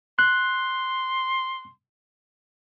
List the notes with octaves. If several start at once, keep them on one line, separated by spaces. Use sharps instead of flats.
C6 F#6